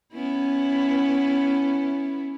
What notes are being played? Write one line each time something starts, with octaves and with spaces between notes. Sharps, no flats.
B3 C#4 E4